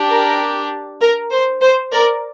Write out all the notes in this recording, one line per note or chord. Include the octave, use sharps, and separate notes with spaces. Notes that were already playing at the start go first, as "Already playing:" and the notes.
Already playing: D4 G4
A#4
A#4
C5
C5
A#4 D5